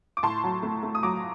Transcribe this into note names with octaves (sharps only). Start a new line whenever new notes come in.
D6
A2 A5 C6
F#3
A3
A3
D#6
F#3 A#5 D6